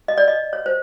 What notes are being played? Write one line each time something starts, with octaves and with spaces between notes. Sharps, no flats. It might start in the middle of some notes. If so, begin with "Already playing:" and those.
D#5
D5
D#5
C#5
C5